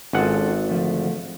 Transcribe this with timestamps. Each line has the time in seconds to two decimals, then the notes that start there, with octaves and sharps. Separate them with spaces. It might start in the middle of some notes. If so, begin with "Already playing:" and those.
0.13 G#1 C#4 F4 A4 F#5
0.69 D3 F3 A3